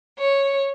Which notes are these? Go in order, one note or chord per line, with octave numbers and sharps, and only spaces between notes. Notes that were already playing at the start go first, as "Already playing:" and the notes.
C#5